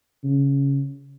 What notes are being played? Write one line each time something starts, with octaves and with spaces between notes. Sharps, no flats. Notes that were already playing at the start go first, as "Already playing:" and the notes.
C#3